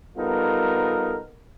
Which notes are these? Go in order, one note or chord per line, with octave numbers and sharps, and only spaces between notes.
G3 B3 D#4 F4 A4 A#4